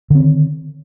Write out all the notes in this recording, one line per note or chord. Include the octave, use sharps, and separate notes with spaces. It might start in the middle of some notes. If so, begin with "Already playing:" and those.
D3 D#3 C4